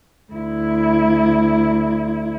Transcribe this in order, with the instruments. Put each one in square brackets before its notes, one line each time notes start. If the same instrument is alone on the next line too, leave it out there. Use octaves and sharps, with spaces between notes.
[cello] D2 E4